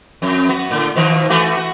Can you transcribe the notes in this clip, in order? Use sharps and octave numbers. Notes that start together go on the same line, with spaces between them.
F2
B3 F#4
A2 D3
B2 D#3 F3
E3 A3 F#4
F#4